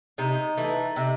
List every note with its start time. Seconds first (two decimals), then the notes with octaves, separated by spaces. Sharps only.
0.18 C3 D#4
0.57 E3 A3
0.96 C3